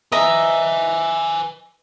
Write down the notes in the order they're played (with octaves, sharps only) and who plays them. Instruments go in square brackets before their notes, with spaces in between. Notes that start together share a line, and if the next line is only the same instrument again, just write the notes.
[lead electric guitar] B4 G#5 [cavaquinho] D#5 A#5 [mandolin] E5